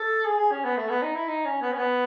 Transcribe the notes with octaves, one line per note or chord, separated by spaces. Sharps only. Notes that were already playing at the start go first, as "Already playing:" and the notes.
Already playing: A4
G#4
G#4
C#4
B3
A3
B3
D#4
E4
D#4
C#4
B3
C#4
B3